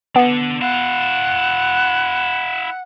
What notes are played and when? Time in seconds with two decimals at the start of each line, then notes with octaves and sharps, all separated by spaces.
0.16 B3 D4 F#5
0.61 E4 F5 F#5